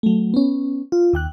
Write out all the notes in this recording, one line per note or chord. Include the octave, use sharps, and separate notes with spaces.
F#3 A3
B3 C#4
F4
D#2 G5 F#6